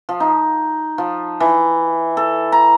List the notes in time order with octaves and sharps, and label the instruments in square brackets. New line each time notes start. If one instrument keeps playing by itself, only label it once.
[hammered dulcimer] F3
D#4
F3
E3
A4
A#5